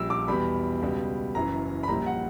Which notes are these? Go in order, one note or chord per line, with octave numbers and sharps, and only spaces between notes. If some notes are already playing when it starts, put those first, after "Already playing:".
Already playing: A#1 A#2 G3 E6
D6
E2 B2 G3 B5
C#2 B2 G3
F#1 F#2 E3 A#5
B5
A#1 A#2 G3 A#5
F#5